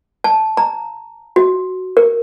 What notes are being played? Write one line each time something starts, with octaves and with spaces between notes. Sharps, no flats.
A5
A#5
F#4
A#4